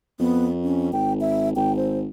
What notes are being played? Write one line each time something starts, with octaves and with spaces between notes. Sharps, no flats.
F2 B3
C#4
G#1 G5
E5
G#1 G5
C5